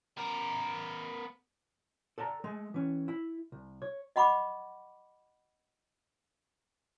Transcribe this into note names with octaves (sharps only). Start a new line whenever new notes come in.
B3 A#4
A4 D5 A5 A#5
G#3 A3
E3 C#4
E4
C2
C#5
D#5 F#5 B5 C#6 D6